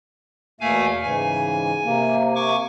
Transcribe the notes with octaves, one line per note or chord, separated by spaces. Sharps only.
E2 B2 A3 A#3 F5 G#5
G#2 C#3 E3 G#5
C3 A#3
G#5 C#6 D6